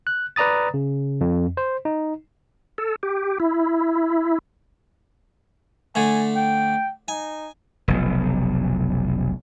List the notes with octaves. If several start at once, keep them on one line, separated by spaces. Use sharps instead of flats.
F#6
B4 D5 A#5 D#6 A6
C#3
F2
C5
D#4
A4
G4
E4
D3 A3 G#5
G5
D#4 G#5
F1 B1